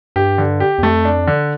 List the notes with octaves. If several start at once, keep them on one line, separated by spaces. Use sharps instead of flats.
G2 G4
D3
G4
E2
F2 A3
D4
D3